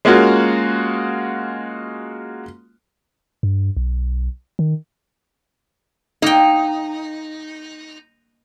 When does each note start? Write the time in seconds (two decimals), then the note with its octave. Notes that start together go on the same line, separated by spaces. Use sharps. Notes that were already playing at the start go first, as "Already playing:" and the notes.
0.05 G#3 A#3 C#4 F4 F#4
3.43 G2
3.77 B1
4.59 D#3
6.22 A#3 D#4 G5